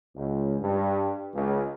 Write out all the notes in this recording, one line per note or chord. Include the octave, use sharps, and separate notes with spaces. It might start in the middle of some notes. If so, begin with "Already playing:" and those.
C#2
G2
C#2